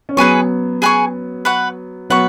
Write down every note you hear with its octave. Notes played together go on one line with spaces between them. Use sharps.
C#4
F#3 B3 G#4 B4 G#5 C#6
G#4 B4 G#5 C#6
B4 F#5 C#6
F#3 B3 B4 F#5 C#6